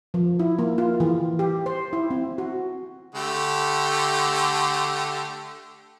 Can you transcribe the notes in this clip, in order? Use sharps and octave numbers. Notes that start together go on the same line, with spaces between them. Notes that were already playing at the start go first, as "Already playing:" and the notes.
F3
E4
A#3
F4
E3
G4
C5
E4
C4
F#4
D3 A3 G4